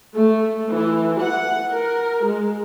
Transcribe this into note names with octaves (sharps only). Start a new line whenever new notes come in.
A3
E3
F#5
A#4
G#3